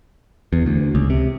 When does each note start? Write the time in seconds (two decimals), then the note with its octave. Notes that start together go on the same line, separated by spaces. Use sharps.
0.53 E2
0.66 D2
0.95 C#2
1.10 C3